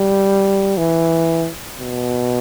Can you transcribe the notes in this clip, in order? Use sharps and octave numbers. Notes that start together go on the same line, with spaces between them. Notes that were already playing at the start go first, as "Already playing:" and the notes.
Already playing: G3
E3
B2